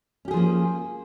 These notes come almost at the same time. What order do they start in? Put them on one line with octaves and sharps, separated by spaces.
C#4 G4 G#4 F3 A#3